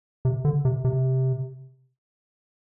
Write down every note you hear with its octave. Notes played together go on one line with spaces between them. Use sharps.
C3
D3
C3
C3